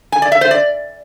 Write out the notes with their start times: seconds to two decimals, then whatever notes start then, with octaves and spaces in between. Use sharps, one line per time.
0.12 G#5
0.22 D5
0.32 E5
0.41 C5
0.51 D5